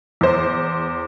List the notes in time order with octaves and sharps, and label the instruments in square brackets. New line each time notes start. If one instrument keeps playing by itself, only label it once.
[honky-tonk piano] E2 C5